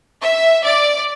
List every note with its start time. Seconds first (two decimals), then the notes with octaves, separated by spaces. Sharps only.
0.21 E5
0.64 D5